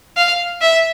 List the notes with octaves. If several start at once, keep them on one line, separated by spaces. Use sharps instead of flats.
F5
E5